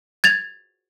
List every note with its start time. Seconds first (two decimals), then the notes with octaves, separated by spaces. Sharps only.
0.24 G#6 A6 F7